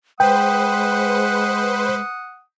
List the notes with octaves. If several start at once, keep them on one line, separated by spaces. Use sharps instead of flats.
G#3 B4 C5 F#5 G5 D#6